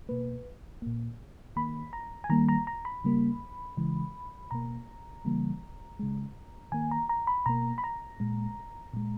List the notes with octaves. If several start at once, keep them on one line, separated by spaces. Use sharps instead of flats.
B2 A#3 B4
A#2 A#3
D#3 A#3 B5
A#5
G#5
D#3 G3 A#3 A#5
A#5
A#5
B5
C#3 G3 A#3
C#3 E3 G#3
B2 A#3 A#5
C#3 E3 G3 A#3
C#3 G#3
D#3 A#3 G#5
A#5
A#5
B5
B2 A#3 A#5
B5
A#5
A#2 G#3
A#2 G#3